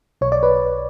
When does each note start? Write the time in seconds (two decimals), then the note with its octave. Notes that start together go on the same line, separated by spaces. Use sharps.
0.21 B1 C#5
0.32 D5
0.43 B4